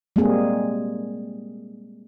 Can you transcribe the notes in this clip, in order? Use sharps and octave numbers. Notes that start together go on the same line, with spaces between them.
G3 G#3 A#3 C4 G#4